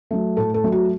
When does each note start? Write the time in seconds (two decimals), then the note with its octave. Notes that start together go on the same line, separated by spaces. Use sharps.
0.11 F#3 A3
0.37 A2 A4
0.54 A4
0.64 F#3 A3
0.72 F#4